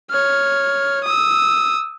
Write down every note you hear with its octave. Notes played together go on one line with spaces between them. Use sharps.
C#5 F6
D#6 E6